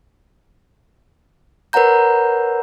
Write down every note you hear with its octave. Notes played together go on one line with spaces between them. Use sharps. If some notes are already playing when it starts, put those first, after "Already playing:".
A#4 B4 C#5 F#5 A#5 G6